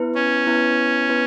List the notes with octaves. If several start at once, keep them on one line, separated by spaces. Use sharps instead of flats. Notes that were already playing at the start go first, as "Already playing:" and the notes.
Already playing: B3 E4 B4
C#4
B3 E4 B4
B3 E4 B4